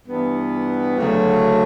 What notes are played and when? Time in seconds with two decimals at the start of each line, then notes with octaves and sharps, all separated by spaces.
0.03 G2 E3 B3
0.95 D2 C#3 F#3 A3